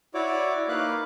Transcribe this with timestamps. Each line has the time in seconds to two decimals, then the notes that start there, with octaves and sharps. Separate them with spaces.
0.14 E4 F#4 C#5 D5 D6
0.68 A#3 D#4 B4 F5 D6 F#6